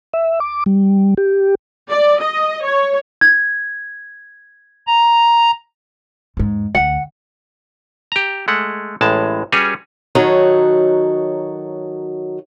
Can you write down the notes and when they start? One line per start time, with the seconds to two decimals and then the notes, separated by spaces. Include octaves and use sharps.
0.14 E5
0.40 D6
0.66 G3
1.17 G4
1.90 D5
2.21 D#5
2.65 C#5
3.21 G#6
4.87 A#5
6.37 E2 G#2
6.75 D2 F#5
8.12 G4 A#5
8.48 G#3 A3 F#5
9.01 A1 A2 G#3 A5
9.52 G3 C#4 F#4 G#4 B4 C#5
10.15 D#3 F#3 D#4 F#4 A4 C#5